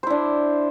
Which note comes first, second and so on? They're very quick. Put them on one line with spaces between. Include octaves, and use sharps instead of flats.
C5 E4 D4